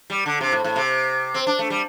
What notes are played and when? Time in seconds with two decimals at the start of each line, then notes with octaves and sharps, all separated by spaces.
0.10 G3
0.26 D3
0.41 C3
0.52 A2
0.65 A2
0.76 C3
1.34 C4
1.47 D4
1.59 A3
1.70 G3